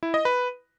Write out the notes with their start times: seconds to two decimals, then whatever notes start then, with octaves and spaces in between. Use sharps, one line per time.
0.03 E4
0.14 D#5
0.25 B4